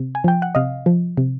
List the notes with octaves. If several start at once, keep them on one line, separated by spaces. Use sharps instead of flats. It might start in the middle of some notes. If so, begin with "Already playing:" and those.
Already playing: C3
G#5
F3 G5
F#5
C3 D#5 F5
F3
C3